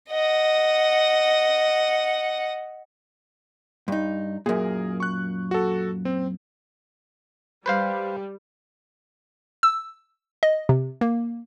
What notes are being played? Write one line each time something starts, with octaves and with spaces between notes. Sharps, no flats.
D#5 F#5
G2 D#4
F#2 A#2 G#4 A#4
C#6 F#6
F#4 A4
C4
G3 B4 C5 F5
E6
D#5
C3
A#3